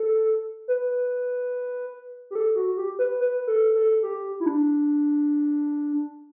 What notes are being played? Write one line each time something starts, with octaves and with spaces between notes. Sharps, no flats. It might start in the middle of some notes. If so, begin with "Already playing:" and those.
Already playing: A4
B4
G4
A4
F#4
G4
B4
B4
A4
A4
G4
E4
D4